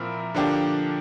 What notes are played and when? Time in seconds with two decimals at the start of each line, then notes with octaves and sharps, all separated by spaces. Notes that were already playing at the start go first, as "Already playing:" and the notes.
Already playing: A#2 F3 C4 E4 A#4
0.35 D3 F3 A#3 D4 G4